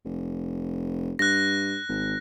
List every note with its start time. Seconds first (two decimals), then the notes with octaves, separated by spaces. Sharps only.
0.05 F1
1.19 G2 F#6 A#6
1.89 G#1